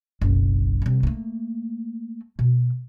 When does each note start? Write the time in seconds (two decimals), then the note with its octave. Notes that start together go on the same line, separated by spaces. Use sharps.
0.21 F#1 B1
0.82 C3 G3
1.03 A3 A#3
2.39 B2